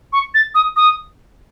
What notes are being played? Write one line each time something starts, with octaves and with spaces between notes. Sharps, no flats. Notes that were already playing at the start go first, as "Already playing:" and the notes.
C#6
A6
D#6
D#6